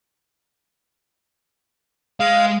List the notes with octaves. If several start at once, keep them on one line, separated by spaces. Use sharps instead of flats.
G#3 F5